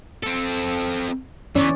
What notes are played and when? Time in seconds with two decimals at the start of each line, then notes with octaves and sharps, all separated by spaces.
0.23 C4 A4
1.55 E3 B3 C#4 C#5 D5